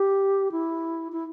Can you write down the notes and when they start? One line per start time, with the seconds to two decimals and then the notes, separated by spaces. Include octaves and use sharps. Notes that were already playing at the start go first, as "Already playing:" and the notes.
Already playing: G4
0.52 E4
1.12 E4